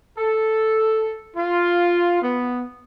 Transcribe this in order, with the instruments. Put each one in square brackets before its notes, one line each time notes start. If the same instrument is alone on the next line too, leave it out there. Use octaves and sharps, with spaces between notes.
[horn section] A4
F4
B3